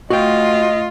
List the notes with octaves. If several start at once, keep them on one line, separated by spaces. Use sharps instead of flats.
A3 F4 F#4 D#5 G5